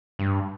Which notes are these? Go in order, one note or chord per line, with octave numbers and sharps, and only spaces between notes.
G2